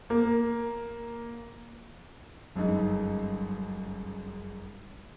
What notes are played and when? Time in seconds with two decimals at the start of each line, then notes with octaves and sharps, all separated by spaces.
0.10 A#3
2.56 G1 F#2 G#3 D#4